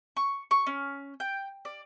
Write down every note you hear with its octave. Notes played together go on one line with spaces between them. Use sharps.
C#6
C#6
C#4
G5
D5